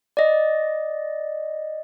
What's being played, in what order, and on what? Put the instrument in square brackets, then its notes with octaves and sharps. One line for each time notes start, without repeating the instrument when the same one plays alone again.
[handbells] D5 D#5